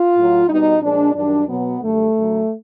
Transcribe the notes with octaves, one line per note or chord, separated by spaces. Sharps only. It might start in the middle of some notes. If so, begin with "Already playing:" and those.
Already playing: F4
A2 F#3
B2 G3 D#4
A#2 F3 G#3 D4
F#2 D#3 G3 D4
B2 F#3 B3
F#2 D3 G3 A3
F#2 D3 F#3